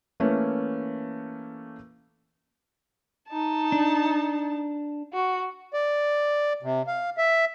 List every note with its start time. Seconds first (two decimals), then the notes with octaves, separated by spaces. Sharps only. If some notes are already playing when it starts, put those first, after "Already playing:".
0.20 E3 A3 A#3 C#4
3.29 D#4 A5
3.72 D4
5.13 F#4
5.73 D5
6.63 C3
6.87 F5
7.17 E5